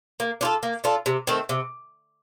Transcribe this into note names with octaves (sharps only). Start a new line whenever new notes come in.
A#3
D4 F4 A4
A#3
D4 F4 A4
C3
D#3 A3 C4
C3